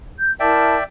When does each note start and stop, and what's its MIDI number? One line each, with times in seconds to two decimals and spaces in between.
0.18 0.32 91
0.40 0.75 64
0.40 0.75 70
0.40 0.84 74
0.40 0.84 76
0.40 0.84 79
0.40 0.75 81